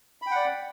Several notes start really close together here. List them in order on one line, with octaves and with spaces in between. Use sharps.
B5 G5 F#5 D5